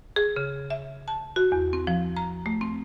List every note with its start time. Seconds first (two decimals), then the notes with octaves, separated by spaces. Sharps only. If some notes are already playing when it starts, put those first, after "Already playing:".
0.16 G#4
0.36 C#3
0.70 E5
1.08 A5
1.36 F#4
1.52 E2
1.73 C4
1.87 F3
2.16 A#5
2.46 A3
2.61 C4